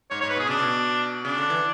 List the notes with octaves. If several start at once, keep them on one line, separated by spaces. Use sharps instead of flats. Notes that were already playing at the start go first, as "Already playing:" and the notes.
G#2 C#5
G#2 C#5
B4
B2 G#4
C#3 D4
B2
C#3 D4
D3
E3